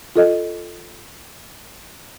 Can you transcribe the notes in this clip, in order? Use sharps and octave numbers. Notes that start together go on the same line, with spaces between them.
F4 A4 D#5